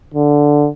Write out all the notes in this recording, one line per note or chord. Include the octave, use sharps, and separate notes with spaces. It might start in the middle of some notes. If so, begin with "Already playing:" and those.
D3